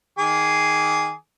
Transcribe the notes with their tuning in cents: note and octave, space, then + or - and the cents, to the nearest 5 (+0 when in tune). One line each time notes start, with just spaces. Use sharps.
D#3 +0 G#4 +0 D6 -20